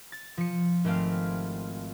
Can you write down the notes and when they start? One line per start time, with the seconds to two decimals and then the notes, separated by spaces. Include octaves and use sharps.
0.12 A6
0.37 F3 C#7
0.84 G#1 A3 C4 F5